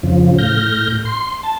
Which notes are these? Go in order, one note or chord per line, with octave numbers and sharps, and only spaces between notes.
F2 C#3 F3
A2 F6 G6 A#6
C6
A5